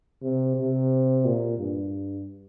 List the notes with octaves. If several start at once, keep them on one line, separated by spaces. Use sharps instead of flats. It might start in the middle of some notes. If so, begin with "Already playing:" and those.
C3
C3
A#2
G2